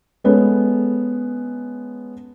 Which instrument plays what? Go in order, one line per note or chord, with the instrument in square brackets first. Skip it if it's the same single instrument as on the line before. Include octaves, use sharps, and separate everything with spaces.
[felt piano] G#3 B3 C#4 A4